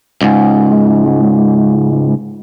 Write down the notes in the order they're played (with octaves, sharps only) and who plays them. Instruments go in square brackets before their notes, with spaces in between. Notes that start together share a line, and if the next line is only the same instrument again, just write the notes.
[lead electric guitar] C#2 G#2